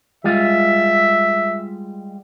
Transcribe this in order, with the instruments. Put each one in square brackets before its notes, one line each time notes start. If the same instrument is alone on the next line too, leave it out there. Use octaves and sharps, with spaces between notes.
[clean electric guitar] G3 G#3 F4 [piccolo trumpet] E5